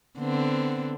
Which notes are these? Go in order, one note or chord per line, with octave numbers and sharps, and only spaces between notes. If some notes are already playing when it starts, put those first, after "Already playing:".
D3 B3 C4